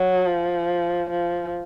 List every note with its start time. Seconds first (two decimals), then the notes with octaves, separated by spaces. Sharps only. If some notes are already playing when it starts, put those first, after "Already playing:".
Already playing: F#3
0.26 F3
1.10 F3